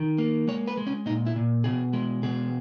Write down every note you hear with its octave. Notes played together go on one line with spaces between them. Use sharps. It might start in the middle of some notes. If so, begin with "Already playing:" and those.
Already playing: D#3
A#3
G#3 C#5
B4
G#3
C#4
A#2 D#4
E4
A#2
B2 G#4
G#3
B2 G#4